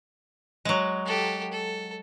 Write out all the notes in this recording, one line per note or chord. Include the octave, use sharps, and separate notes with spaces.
F#3 G#3
G4 A4
A4